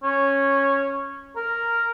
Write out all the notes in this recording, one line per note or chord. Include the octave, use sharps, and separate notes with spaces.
C#4
A#4